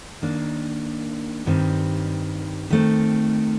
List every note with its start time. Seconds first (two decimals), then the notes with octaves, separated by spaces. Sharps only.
0.22 D#3 A#3 D4
1.46 G2 D#3 G3 C4
2.70 D#3 A3 C4